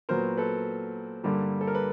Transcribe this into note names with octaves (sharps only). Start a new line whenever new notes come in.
A#2 F#3 B3 A#4 C5
A4 B4
G2 D3 G3 A#3
A4
A#4
B4